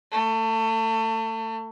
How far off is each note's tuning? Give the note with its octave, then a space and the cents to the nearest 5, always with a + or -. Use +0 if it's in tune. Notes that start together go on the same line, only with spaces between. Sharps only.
A3 +30